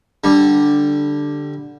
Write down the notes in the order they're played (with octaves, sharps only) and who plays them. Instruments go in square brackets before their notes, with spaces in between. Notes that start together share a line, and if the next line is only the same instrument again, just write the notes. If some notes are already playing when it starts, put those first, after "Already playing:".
[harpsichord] D3 G3